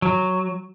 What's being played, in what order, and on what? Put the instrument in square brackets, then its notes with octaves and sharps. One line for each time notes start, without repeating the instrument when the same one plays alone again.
[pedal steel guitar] F#3